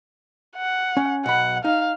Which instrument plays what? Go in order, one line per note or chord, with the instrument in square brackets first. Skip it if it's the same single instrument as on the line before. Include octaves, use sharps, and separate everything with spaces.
[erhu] F#5
[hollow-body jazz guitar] C#4
[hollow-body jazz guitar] B1 B5 [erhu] F#5
[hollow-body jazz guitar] D#4 [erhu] F5